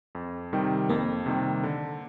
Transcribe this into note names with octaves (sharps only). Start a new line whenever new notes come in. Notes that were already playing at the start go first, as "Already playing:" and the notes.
F2
C3 D#3 G3
F2 A#3
C3 D#3 G3
D3